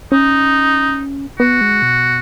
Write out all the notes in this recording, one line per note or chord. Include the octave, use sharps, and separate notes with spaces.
C#4 D#4
B3 F#4
G#3
B2